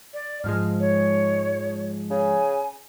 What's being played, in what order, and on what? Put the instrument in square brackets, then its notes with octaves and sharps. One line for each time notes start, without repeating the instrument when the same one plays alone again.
[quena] D5
[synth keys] G#2 F3 G#3 [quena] F6
[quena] C#5
[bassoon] C#3 [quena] G#5